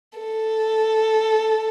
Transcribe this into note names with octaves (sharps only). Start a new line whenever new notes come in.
A4